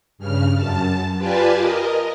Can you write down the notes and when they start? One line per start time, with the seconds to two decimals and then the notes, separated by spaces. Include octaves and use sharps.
0.18 G2 C#3 F6
0.55 F#2 A5
1.17 F4 G4 B4 D5 G#5 A5
1.58 A#4 D#5